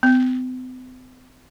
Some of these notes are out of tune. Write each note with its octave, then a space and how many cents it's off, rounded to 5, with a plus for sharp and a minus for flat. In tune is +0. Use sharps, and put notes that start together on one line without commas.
C4 -45